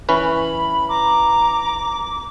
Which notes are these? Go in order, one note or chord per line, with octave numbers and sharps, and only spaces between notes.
E3 C#4 B4 B5
A#5 D6